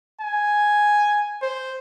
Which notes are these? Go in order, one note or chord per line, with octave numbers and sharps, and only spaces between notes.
G#5
C5